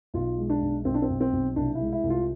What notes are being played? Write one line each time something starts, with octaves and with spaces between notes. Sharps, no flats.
B1 F4
G#3
D4
B1
B1 C4
D4
C4
B1
C4
B1
C2 D4
E4
G#3
E4
C2
F4